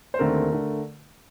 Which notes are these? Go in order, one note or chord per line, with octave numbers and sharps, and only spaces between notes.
C5
D#2 D3 A3 C4 A#4
D3 A3